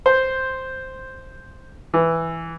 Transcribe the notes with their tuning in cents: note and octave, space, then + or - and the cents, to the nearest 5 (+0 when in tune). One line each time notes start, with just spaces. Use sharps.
C5 +0
E3 +0